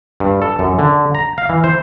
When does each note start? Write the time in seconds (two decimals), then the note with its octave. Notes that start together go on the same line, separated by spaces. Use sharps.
0.20 G2
0.42 A4
0.59 F#2
0.79 D3
1.15 A#5
1.38 F5
1.49 E3
1.64 C5